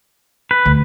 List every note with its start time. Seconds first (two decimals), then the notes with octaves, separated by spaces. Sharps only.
0.51 B4
0.66 D2